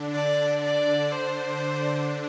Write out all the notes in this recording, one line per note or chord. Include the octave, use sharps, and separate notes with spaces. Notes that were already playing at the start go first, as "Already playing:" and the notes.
Already playing: D3 D4
D3 D4 D5
D5
C5